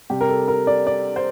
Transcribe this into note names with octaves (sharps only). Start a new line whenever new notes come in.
C3 G3 G4
A#4
A4
A#4
D5
D5
C5